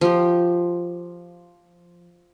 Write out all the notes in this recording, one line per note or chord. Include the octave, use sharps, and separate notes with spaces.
F3 G4